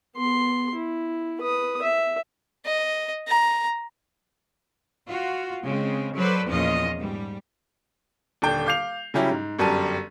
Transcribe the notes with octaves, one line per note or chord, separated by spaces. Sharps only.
B3 C6
E4
B4 D#6
E5
D#5
A#5
F4 F#4
C#3 G#3 C4
F#3 A4 B4 C5 D5
E2 A#2 F3 C#4 F4 D#5
G#2 G3
D#1 D3 D4 G5
F5 D6 G6 C7 F7
C#3 F#3 G3 C#4 E4 G4
G#2
G1 F#2 G3 D5 A5 D#7